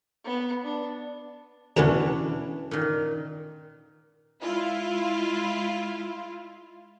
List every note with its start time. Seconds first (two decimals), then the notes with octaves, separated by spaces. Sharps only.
0.24 B3
0.64 D4
1.77 B2 D3 E3 B3 C#4 D4
2.71 A#2 D#3
4.42 G#3 E4 F4